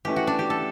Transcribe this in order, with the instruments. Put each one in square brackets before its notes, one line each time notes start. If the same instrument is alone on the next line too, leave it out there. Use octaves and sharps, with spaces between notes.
[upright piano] E3 A3 C#4 E4 [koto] G4
[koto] F#4
D4
G4
A4